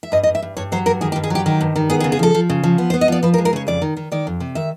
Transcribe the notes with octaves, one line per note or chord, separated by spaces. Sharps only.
E5
G2 D#5
D#5
G2
E5
G2
G2 C#5
F#3 C5
G2 A#4
D#3 G#4
G4
G2
G#4
F#3 G4
D#3 G4
G2
D#3
B3 G#4
G#4
C#3
G#4
F3 A4
F3
C#3
F3
B3
C5
B3
D#5
F3 D5
F3 B4
A#4
G#3
A#4
C#3 C#5
F2 D5
D#3
D#3
D#3 D5
F2
C3
D#3 E5